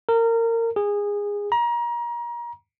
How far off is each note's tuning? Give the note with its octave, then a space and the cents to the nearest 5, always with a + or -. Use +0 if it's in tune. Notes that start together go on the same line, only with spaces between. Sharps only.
A#4 -25
G#4 -20
A#5 +30